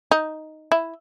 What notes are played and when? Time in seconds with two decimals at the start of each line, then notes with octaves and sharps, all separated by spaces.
0.11 D#4
0.72 E4